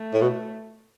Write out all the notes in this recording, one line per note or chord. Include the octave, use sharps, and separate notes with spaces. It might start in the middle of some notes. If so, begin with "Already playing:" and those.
Already playing: A3
A2
B2